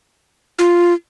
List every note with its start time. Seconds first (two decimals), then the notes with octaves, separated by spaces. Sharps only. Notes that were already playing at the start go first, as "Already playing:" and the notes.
0.59 F4